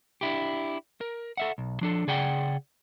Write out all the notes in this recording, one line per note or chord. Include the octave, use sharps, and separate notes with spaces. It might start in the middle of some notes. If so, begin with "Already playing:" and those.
D4 E4 G4
A#4
A4 E5 F#5
B1
F3 D4 A4
C#3 G#4 D5 F#5 G5